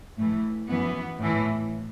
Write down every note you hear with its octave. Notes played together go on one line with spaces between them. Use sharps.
A2 E3 A3
F#2 E3 B3
A2 E3